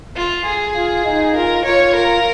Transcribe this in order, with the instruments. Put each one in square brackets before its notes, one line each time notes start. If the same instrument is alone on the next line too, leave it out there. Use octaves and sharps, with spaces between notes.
[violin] F4
G#4
[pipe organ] F4
D#4
[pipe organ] F4 [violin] A#4
[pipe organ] F4 [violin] C#5
[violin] A#4